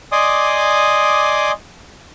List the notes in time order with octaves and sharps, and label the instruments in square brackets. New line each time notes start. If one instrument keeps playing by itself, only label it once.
[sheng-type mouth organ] D5 D#5 G#5 C6 D6 D#6